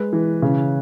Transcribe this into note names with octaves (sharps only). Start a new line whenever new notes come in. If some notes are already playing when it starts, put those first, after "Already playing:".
Already playing: G#3 B4
E3
C#3